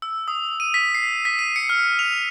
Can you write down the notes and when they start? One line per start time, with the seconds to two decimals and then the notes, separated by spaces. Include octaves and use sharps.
0.02 E6
0.28 D#6
0.60 D#7
0.74 B6
0.95 C7
1.25 B6
1.39 D#7
1.56 C#7
1.70 F6
1.99 F7